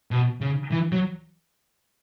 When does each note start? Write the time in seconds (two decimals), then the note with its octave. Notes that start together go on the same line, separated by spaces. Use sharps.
0.11 B2
0.41 C#3
0.71 E3
0.92 F#3